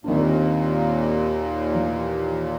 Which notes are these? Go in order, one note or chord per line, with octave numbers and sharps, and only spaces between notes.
D#2 A#2 D#3 C4 D4
E3